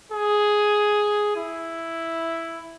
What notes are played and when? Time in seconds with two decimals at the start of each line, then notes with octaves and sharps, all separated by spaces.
0.12 G#4
1.36 E4